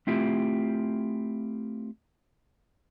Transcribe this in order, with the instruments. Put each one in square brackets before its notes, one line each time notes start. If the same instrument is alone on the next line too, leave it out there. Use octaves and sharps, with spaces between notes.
[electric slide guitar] A3 C4 E4 F4 G4